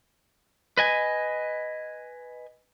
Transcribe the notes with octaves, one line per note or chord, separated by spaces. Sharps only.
B4 D#5 G#5